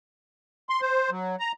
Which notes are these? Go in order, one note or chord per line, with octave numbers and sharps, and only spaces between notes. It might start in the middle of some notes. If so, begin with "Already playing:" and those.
C6
C5
F#3
A#5